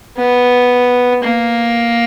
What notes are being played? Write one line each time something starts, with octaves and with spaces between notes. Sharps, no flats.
B3
A#3